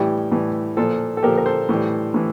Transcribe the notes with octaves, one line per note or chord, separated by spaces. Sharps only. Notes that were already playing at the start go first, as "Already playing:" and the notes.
Already playing: A2 E3 G3 E4 G4
A2 E3 G3
A#2 F3 F4 A4
A4
A#2 F3 G4 A#4
A#4
A4 C5
A2 E3 G3
A2 E3